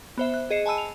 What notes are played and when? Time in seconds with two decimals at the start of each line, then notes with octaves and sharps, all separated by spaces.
0.18 B3 C5 E5
0.34 F#6
0.50 G#4 D#5 C7 C#7 E7
0.66 G#5 A5 B5 E6 D#7
0.78 F7